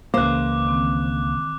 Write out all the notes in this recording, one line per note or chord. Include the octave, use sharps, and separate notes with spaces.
C#2 B2 E3 A#3 C5 D6 F#6
D#3 C4